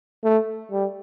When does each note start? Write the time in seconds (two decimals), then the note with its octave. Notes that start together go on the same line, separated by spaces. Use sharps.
0.23 A3
0.71 G3